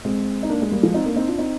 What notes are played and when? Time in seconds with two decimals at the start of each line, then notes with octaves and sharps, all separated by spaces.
0.05 G#3 C4
0.43 D#4
0.49 A#3 D4
0.62 G#3
0.72 G3 A#3
0.83 F3 G#3
0.94 C4 D#4
1.05 A#3 D4
1.16 C4 D#4
1.27 D4 F4
1.38 C4 D#4